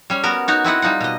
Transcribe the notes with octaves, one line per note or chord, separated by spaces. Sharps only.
G3 C#4
B3 F#4 A#4
D#4 F#4 C#5
C4 E4 D#5 F#5
G3 D#4 F4 F#5
B2 D#5